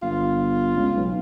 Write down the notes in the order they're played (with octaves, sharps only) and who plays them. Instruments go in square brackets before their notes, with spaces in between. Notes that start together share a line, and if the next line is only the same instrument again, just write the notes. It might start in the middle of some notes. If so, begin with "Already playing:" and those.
[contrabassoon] G1 [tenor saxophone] F4
[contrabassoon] C#2
B1